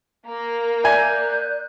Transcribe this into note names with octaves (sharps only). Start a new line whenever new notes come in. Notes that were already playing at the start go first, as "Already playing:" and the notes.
A#3 A#4
D5 E5 G#5 F#6 G6